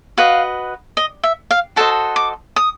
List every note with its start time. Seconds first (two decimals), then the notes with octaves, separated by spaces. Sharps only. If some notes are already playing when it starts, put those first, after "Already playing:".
0.17 F#4 B4 D#5 F5
0.97 D#5
1.24 E5
1.51 F5
1.76 F#4 A4 C5 D#5 A5
2.16 D6
2.56 D#6